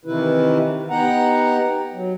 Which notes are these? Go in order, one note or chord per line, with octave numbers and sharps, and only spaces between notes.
C3 D#3 E3 E4 B4
B3 D#4 G4 F#5 A#5
F#3